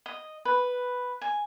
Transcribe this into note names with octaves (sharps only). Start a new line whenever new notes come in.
D#5
B4
G#5